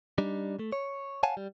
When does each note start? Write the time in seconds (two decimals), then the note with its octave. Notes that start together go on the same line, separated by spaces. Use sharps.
0.18 G3 D4 D#4
0.59 A3
0.72 C#5
1.23 C#5 F5 F#5 G#5 A5
1.37 G3